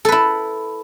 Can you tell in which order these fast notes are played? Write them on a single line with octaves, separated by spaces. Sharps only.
A4 B4 E4